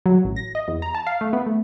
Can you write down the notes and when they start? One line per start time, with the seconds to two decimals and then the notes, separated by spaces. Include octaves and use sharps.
0.06 F#3
0.25 A1
0.36 A#6
0.55 D#5
0.68 E2
0.82 A#5
0.95 A5
1.07 F5
1.21 A3
1.33 B3
1.46 A3